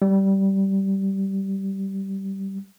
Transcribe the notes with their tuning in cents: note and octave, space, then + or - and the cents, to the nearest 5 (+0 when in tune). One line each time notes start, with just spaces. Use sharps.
G3 -15